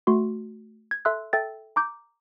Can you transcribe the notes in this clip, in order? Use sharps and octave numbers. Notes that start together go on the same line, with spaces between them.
A3 F#4 C6
G#6
A4 E5 C6 E6 F#6
A4 E5 G5 A6
A#5 D6 G6